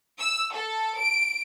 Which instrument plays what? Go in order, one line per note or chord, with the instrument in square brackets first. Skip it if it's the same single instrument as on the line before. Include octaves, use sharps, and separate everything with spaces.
[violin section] E6
A4
D7